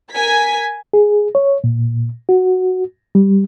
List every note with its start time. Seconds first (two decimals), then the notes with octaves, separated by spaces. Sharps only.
0.12 A#4 G#5 G#6 B6
0.93 G#4
1.35 C#5
1.64 A#2
2.29 F#4
3.15 G3